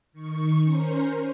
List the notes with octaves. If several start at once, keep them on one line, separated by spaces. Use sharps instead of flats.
D#3 C#6
C#4 A#4 C5